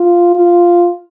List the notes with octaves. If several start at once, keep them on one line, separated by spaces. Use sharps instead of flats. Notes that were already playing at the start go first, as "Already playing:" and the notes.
Already playing: F4
F4